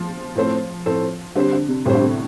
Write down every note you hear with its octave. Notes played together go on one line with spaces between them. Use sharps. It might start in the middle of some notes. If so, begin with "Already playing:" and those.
Already playing: F3
A2 A3 C4 A4 C5
A2 A3 C4 A4 C5
D3 G3 C4 G4 C5
D3
C3
A2 G3 C4 G4 C5
D3
C3